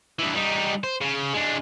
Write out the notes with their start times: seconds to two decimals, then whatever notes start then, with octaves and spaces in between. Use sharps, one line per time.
0.19 G2 E3
0.35 G3 D#4
0.84 C5
1.01 C#3
1.33 G#3 D4